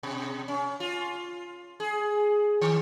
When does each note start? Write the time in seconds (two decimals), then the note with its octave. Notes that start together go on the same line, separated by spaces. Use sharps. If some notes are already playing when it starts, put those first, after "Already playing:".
0.03 B2
0.48 C#4
0.80 F4
1.80 G#4
2.61 D#3